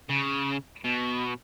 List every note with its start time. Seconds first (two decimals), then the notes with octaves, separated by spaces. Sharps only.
0.09 C#3
0.84 B2